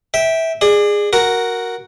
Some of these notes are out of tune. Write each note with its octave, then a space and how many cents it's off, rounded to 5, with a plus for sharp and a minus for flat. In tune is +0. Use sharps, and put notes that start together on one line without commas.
E5 -15 G5 +0
G#4 -10 D5 +30
F#4 +0 A#4 +0